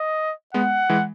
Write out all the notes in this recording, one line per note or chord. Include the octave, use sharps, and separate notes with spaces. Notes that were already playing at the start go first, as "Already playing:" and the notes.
Already playing: D#5
G#3 B3 F#5
E3 G#3